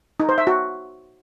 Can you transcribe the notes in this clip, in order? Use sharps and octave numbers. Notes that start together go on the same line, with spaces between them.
D#4
C5
E5
F#4